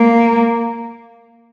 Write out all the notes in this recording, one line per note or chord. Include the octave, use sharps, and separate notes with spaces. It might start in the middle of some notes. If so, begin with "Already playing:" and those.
Already playing: A#3